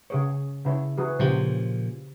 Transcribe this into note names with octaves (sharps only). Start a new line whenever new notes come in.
C#3 G#4 C#5
C#3 E4 C#5
E3 F#4 G#4
A#2 C#3 F3 G4 C5